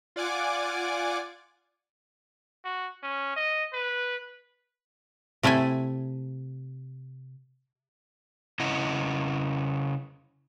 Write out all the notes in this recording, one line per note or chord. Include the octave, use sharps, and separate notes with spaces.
F4 D5 F#5 G#5 D6
F#4
C#4
D#5
B4
C3 A3 E4 A4 G#5
C#3 E4 D#5 F#5